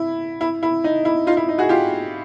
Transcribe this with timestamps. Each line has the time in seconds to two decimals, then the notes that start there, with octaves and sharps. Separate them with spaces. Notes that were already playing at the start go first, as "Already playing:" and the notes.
Already playing: E4
0.41 E4
0.63 E4
0.84 D#4
1.05 E4
1.27 D#4 F4
1.37 E4
1.49 D#4
1.58 F#4 G#4
1.69 F4 G4